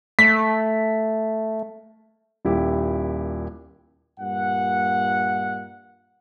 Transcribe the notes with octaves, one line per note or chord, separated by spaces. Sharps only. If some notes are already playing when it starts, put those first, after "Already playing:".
A3 B6
D#1 A#2 E4 G4
G2 A#2 F#5